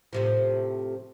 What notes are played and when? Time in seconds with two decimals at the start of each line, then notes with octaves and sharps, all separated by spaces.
0.13 A2 C3 F3